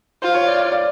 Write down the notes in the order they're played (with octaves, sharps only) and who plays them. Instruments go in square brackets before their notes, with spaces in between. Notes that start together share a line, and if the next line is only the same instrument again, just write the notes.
[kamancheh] F4 [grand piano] C5
[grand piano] C#5
D5
D5
D5